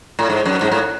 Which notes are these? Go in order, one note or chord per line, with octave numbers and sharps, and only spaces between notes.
A2
G#2
F#2
G#2
A2